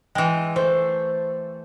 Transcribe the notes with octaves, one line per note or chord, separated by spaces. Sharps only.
E3 G#3 G5
A3 C5